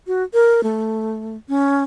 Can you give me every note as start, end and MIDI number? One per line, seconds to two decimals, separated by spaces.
0.07 0.23 66
0.33 0.63 70
0.63 1.37 57
1.49 1.84 61